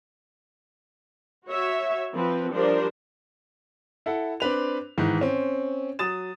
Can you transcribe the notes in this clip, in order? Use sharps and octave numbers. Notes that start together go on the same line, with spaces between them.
F#4 C#5 E5
F3 C4 B4
F3 G3 D4 A#4 C5
E4 A4 F#5
C4 D4 B4 F7
G#2 D#3 E3
C4 C#4
F#3 D#6 A6 E7